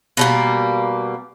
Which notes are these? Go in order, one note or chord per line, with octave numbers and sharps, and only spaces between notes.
B2 G3 A#3